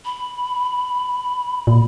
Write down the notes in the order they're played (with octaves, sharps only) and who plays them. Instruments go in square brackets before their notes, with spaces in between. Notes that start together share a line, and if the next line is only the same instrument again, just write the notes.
[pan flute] B5
[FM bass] A#2